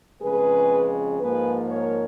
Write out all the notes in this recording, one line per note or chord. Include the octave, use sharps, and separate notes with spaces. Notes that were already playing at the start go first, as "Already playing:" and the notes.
F2 C#3 G#3 G#4 B4
G#2 F3 A#3 G#4 B4
A#4 C#5